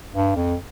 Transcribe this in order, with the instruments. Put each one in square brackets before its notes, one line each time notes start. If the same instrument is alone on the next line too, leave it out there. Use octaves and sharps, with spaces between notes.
[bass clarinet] G2
F2